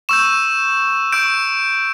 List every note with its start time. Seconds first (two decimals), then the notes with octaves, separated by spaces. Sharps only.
0.09 C#6 E6 G6 E7
1.12 C#6 E6 G6 D7